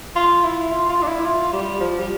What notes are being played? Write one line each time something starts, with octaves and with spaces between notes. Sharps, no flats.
F4
E4
F4
F4
D4
E4
F4
G3
F3
G3